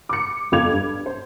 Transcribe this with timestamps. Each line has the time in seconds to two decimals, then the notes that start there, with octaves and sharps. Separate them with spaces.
0.09 D6 C#7
0.52 G1 F2 F5 D6 G#6 F7
0.72 G2
1.06 C5